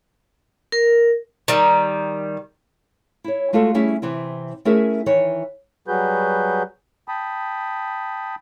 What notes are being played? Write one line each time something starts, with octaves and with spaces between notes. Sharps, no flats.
A#4
D#3 G3
E4 C#5
G#3 A3 F4 F#4 A4
G3 A3 C#4 E4 G#4 E5
C3 E3 C4 E4
A3 C#4 E4 G#4 A#4 E5
D#3 E3 E4 C#5
F#3 G3 F#4 G#4 B4 G6
G5 A5 B5 D#6